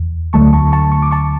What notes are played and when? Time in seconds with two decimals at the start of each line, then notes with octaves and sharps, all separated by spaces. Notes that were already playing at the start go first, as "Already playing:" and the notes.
Already playing: E2
0.33 D2 D3 F#3 A3 A5 C#6
0.53 A5 C#6
0.72 A5 C#6
0.92 C#6
1.02 D6
1.11 A5 C#6